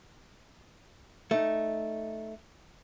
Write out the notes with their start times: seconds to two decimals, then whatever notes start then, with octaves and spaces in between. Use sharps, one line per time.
1.31 A3 D#4